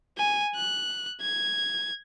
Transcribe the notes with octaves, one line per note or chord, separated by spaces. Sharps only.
G#5
F#6
G#6